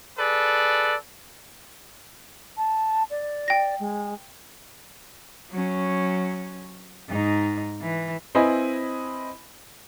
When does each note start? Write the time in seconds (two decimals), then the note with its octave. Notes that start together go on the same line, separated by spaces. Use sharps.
0.19 G#4 A4 B4 D5
2.57 A5
3.10 D5
3.48 G5 A#6
3.80 G#3
5.51 F#3 C#4
7.09 G#2 D#4
7.82 E3
8.35 C4 E4 B4 D#5 G#5 B5